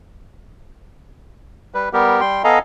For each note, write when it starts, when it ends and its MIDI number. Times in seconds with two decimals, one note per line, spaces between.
1.74 1.89 55
1.74 1.89 71
1.93 2.21 55
1.93 2.21 59
1.93 2.21 67
1.93 2.21 70
2.21 2.42 55
2.21 2.42 79
2.21 2.42 84
2.44 2.59 59
2.44 2.59 69
2.44 2.59 75
2.44 2.59 77
2.44 2.59 80
2.44 2.59 82